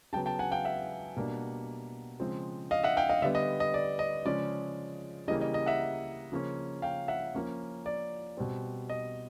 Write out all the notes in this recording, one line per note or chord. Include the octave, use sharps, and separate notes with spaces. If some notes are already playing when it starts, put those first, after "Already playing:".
C#3 F#3 B3 G5 A5
G5 A5
F#5 G#5
F5 G5
E5 F#5
B2 G3 A#3 D4
C#3 F3 G#3 C4
D#5 F5
E5 F#5
F5 G5
D#5 F5
D3 G3 B3 D5 E5
D#5
D#5
D5
D#5
C#3 F3 G#3 C#4 D5
C#3 E3 G3 A#3 D#5
D#5
D#5
E5 F#5
C#3 F3 A#3 C#4
F5 G5
E5 F#5
F3 A#3 C#4
D5
B2 G3 C4
D#5